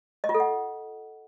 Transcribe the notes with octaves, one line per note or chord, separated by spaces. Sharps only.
D#5
F4
A4
F#5